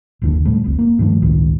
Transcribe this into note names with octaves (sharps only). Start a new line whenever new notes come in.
F#1 D#2 D3
A2 D3 G3 A3
F1 C#2 C4
A#3
G2 D#3 F3 A3
G1 C#2 A2 D#3